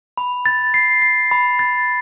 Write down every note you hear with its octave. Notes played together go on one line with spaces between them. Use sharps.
B5
A6
C7
C7
B5
A6